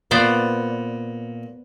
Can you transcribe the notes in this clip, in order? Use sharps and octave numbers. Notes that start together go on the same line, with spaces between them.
A#2 B3 C5 D5